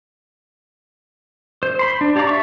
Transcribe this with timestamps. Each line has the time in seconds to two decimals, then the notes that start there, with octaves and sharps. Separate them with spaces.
1.63 C5
1.79 C5 B5 C6
2.01 D4
2.16 G4 D5 F5 A#5 D6
2.27 E5 A5 C#6